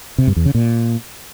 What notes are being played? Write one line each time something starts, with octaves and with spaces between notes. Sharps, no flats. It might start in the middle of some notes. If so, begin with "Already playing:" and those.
C3
G2
E2
C#3
A#2